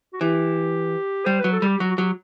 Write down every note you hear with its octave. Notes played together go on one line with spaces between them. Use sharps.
F#4
E3 G4
G3 C5
F#3 B4
A4
G3 G4
F#3 F#4
F#4
F#3 G4